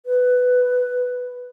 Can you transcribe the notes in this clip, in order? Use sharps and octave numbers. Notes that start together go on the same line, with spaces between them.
B4